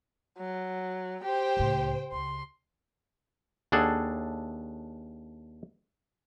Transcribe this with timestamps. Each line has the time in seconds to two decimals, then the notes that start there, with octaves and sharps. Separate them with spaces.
0.38 F#3
1.24 G4 C5 G5
1.57 C#2 A2
2.12 C#2 C6
3.72 D#2 D4 G#4 A4 F#5